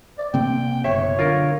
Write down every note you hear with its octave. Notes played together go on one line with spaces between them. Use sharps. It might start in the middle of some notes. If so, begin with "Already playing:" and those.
D5
C3 A#3 C4 G5
F#1 B2 C#5 E5
D3 F4 A#4